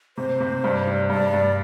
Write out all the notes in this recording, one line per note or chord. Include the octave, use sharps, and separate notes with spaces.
C3 C5
C3
G2
G3
G2 D5
G2